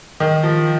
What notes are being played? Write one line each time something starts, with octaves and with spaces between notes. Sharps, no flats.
D#3
F3